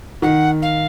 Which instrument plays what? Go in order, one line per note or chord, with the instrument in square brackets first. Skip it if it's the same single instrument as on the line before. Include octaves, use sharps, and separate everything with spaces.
[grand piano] D#3 [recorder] F#5
[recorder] F5